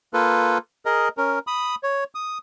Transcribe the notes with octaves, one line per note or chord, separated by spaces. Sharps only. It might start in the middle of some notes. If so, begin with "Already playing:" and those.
A#3 F4 A4 B4
G#4 A#4 D#5
C#4 A#4
B5 D#6
C#5
D#6